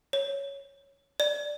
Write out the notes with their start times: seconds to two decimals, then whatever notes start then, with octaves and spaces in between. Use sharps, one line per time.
0.13 C#5
1.20 D5